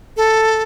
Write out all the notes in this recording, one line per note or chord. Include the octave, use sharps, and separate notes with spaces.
A4